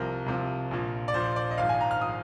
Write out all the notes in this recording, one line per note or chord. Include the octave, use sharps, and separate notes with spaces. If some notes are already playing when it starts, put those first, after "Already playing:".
Already playing: C2 C3 F3 A#4
C2 C3 F3
A#1 A#2 F3
D5
A#1 A#2 F3 C5
D5
D#5
G#1 G#2 F3 F5
G#5
A#5
F6
F3 D#6